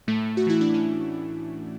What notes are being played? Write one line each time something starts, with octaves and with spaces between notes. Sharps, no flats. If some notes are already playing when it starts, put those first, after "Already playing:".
A2 A3
F#4
E3 E4
D4
C#4